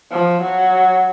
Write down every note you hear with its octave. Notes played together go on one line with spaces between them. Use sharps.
F3
F#3